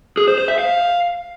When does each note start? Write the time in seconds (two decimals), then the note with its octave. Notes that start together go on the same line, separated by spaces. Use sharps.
0.17 G#4
0.28 C5
0.38 C5
0.48 E5
0.58 F5